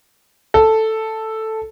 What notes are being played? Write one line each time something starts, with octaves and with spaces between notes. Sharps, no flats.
A4